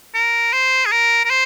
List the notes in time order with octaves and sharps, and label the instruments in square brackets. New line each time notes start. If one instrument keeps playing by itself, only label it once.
[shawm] A#4
C5
G#4
A#4
A#4
C5